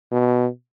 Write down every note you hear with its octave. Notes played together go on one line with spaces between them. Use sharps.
B2